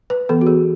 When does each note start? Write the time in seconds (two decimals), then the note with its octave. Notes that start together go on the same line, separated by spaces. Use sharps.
0.10 B4
0.29 E3 B3 A4
0.41 F#4
0.46 G#4